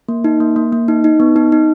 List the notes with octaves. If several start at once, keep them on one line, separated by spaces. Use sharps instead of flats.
A#3
D#4
A#3
A#3
A#3
D#4
D#4
B3
D#4
D#4